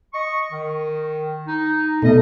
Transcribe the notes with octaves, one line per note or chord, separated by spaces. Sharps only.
D#5 C#6
D#3
D#4
B2 G3 A3 D#5